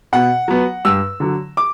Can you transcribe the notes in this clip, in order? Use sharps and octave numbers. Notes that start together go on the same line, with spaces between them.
B2 F#5
F#3 B3
G2 E6
D3 F#3
D6